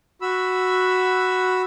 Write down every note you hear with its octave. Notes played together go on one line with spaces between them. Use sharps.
F#4 B5 E6